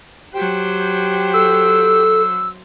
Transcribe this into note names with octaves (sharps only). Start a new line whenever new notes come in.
F#3 G4 C5 G5
A4 E6